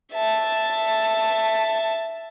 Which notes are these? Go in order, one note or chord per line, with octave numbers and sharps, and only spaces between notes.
E5 A5